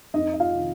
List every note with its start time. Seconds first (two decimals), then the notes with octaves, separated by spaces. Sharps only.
0.14 F2 D#4 D#5
0.34 D#5
0.40 F4 F5
0.53 C3 D#3